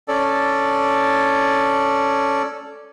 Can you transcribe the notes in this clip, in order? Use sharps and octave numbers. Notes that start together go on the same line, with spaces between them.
C#4 A4 D5